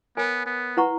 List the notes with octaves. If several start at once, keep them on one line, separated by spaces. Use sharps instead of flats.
B3 A#4 C#5 G#5 B5
B3
E4 B4 F#5 A#5 C#6